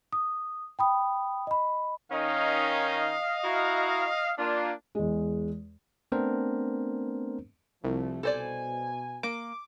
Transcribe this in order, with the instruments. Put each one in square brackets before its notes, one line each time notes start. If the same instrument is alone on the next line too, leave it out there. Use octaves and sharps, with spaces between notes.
[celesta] D#6
G5 B5 D#6
D#5 B5
[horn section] D#3 C#4 D#4 [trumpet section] D#5 F5
[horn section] E4 F#4 A#5
[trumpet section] A#3 F4 [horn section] D4
[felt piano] E2 G#3
[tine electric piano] A3 B3 C4 D4 A#4 C5
[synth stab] C2 [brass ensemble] F3 A3
[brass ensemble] B2 G#5 [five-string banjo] A4 C5 D5
[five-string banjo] A#3 [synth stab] D6